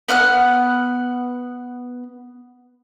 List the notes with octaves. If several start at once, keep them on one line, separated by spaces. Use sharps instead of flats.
B3 F#5 F6 F#6